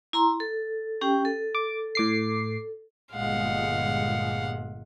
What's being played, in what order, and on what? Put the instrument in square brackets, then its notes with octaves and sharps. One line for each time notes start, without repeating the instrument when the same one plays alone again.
[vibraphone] E4 A#5 C6
A4
C#4 G4 G5
A4
[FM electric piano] D6
A2 D6 C7
[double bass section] G1 A#2 G#3 [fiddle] F5 F#5